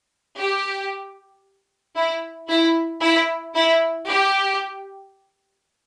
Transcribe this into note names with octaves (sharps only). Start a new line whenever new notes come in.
G4
E4
E4
E4
E4
G4